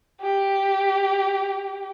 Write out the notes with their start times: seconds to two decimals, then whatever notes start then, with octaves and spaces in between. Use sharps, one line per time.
0.21 G4